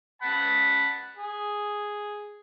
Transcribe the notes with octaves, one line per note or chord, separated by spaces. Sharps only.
F#5 A5 B5
G#4